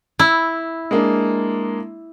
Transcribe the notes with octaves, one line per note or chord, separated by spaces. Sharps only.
E4 E6
G#3 A#3 D4